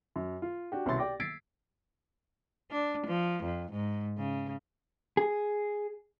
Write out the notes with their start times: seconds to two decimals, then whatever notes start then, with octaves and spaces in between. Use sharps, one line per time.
0.16 F#2
0.42 F4
0.72 D4 F#4 G4
0.86 C2 B2 C#4 E4 C6 A6
0.98 G4 D5 G5 D6 A#6
1.20 E6 G#6 A6 B6 C7 D7
2.71 D4
3.07 F3
3.44 F2
3.72 G#2
4.18 C#3
5.17 G#4